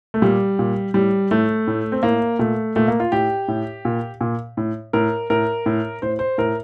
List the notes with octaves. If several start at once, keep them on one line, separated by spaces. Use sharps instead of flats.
A3
A#2 G3
A#2
A2 G3
A2 A3
A2
C4
A2 A#3
A#2 A3
A#2 A3
A#3
F4
A2 G4
A2
A#2
A#2
A2
A2 A#4
A2 A#4
A2
A2 C5
C5
A2 A#4